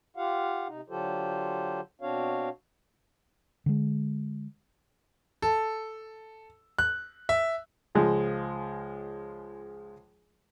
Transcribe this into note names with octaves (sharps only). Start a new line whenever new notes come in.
F4 G4 F5 F#5
C3 D#4
D3 F#3 F4 G4 A4 C5
B2 C4 D4 F#4 C#5 F5
D3 G#3
A4
F#6
E5
C#2 F3 G#3